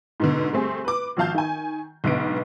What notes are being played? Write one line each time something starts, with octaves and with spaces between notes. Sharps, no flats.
G#2 B2 D3
G3 A3 C4 G#4
B4 D6
G#1 F3 F#4 F5 A5 G6
D#3 G#5
B1 G#2 D3 B3 D7